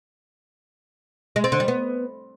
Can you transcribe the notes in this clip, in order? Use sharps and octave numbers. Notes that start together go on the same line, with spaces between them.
G#3
C4
D3
G3
B3